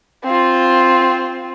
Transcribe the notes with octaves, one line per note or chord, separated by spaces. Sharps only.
C4 F4